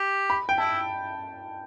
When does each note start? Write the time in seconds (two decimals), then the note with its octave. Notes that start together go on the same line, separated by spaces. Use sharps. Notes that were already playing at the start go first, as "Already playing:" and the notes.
Already playing: G4
0.30 B5
0.49 G5
0.58 E4 A5